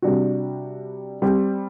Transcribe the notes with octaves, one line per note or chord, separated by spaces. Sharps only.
C3 G3 D4 F#4
G3 C4 G4